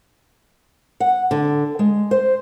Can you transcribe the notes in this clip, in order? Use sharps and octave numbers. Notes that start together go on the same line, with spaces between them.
F#5
D3
G#3
C5